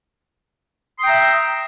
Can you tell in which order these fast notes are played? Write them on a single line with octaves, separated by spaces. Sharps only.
C6 D#6 G5 A#5 E5